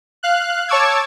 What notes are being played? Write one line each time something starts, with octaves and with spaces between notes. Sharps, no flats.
F5 F#6
C#5 A5 C#6 D6 E6 G#6